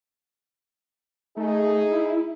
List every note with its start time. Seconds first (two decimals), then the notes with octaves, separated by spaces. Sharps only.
1.37 A3 D#4 G#4
1.92 E4